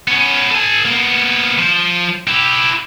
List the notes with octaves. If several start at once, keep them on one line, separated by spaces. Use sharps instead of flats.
B3 C#4
A4 G#5
A#3 B3
F3
E4 G4